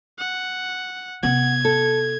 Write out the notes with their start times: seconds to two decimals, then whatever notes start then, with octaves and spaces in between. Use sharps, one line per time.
0.19 F#5
1.23 C3 B3 F#5 G#6
1.65 A4